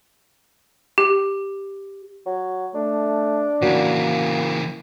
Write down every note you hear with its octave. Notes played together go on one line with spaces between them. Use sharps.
G4
F#3
A3 D4
C#3 E3 A#3 F#4 C#5